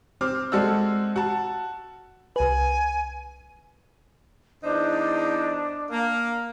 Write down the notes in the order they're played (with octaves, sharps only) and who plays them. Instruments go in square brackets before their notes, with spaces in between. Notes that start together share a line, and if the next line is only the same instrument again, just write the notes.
[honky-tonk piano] C4 D6 F6
G#3 C4 F#4 A4 D5 E6
F#4 A5
[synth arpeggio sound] C2 B4 [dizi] G#5
[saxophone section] E2 D#4 C5 [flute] D4
[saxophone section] A#3